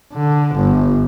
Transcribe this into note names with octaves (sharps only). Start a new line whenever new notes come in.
D3
G1